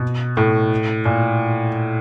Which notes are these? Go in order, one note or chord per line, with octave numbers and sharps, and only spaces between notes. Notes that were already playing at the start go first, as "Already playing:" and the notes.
Already playing: B2
A2
A#2